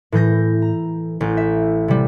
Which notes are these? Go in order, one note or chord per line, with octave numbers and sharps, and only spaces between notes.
A2 E3 G6 A#6
A#5
A1 G6
E5
C3 G3